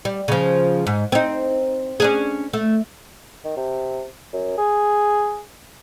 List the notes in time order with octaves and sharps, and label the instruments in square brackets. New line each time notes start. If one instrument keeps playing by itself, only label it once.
[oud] G3
C#3 F3
G#2
C4 D#4
C#4 D4 G#4
A3
[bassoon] D#3
C3
F#2
G#4